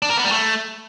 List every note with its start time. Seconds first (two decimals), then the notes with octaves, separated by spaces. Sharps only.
0.02 D4
0.10 A#4
0.17 B3
0.24 G3
0.32 A3